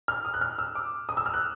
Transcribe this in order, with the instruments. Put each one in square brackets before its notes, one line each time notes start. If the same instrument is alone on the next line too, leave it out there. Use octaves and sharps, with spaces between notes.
[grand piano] F6
D#6
F#6
F6
E6
D6
D#6
E6
F6
F#6